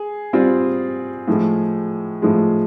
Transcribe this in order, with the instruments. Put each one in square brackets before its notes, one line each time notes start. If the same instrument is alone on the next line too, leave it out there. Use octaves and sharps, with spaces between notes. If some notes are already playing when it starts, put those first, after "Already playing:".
Already playing: [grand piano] G#4
[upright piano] G3 C4 F4
A2 F3 G#3
A2 F3 G#3